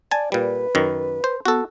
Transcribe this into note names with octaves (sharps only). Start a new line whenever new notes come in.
D5 G#5 A5
A#2 G3 B4
F#2 D#3
C5
B3 F#4 A4